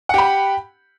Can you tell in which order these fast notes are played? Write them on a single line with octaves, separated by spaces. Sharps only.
F#5 G4 B5